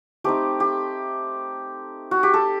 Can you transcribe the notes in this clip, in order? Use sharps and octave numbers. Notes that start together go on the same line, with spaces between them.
A3 C4 D#4 G4
G4
F#4
G4
A4